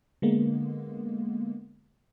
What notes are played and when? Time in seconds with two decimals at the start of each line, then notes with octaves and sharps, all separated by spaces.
0.22 D3 G#3 A#3 B3